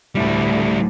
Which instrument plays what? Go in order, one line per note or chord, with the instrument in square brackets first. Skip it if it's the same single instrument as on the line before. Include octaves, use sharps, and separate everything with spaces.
[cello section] D2 A2 D3 [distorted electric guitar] G3 E4